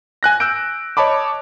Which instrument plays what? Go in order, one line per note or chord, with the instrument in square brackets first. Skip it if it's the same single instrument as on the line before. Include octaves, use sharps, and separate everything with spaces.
[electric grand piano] G#5 F#6 A#6
E6 F#6 G6 D7
C#5 D#5 A5 B5 D6